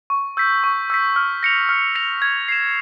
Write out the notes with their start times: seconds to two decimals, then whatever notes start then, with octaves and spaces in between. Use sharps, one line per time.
0.10 C#6
0.37 E6 G6 B6
0.64 C#6
0.90 E6 G6 B6
1.16 F6
1.43 A#6 C#7 F7
1.69 F6
1.95 A#6 C#7 F7
2.22 G#6
2.48 C7 E7